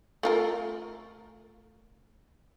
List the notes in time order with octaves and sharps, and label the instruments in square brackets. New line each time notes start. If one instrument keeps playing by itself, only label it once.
[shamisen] A3 F4 A#4